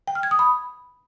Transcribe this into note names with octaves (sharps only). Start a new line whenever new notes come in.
G5
F6
G#6
D#6
B5